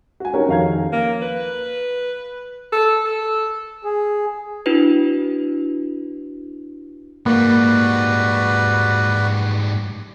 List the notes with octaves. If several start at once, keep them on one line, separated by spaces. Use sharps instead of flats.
F#4 G#5
C#4 D#4 F#4 G4 A#4 C#5
F2 D#3 F5 A#5 G#6
A#3
B4
A4
A4
G#4
D4 E4 F#4 B4
G#2 G3 A#3 F#4 B4 D5